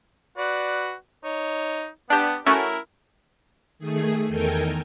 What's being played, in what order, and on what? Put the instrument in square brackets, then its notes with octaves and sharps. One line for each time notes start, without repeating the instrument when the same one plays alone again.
[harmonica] F#4 B4 D5
D#4 C#5
[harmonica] B3 F#5 A5 [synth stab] D4 G4
[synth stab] A3 C#4 F#4 [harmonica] E4 A#4
[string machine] D#3 A3 G#4
E2 D#3 A4 A#4 G5 G#5